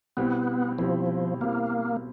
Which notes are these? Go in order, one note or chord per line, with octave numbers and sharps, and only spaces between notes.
B2 G3 B3 C4 E4
B2 F3 G3 C4 E4
B2 G3 A#3 C4 E4